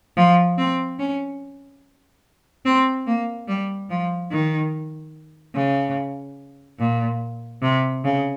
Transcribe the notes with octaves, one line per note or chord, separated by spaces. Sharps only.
F3
C4
C#4
C4
A#3
G3
F3
D#3
C#3
A#2
C3
C#3